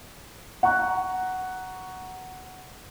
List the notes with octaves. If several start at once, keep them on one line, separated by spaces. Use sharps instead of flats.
F#5 A#5 C#6 F#6